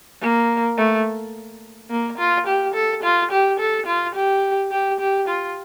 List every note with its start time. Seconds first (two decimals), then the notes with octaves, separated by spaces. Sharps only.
0.21 A#3
0.78 A3
1.90 A#3
2.18 F4
2.47 G4
2.74 A4
3.03 F4
3.31 G4
3.60 A4
3.87 F4
4.15 G4
4.72 G4
5.00 G4
5.28 F4